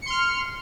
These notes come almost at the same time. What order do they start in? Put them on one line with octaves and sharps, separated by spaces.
C#7 C6 F6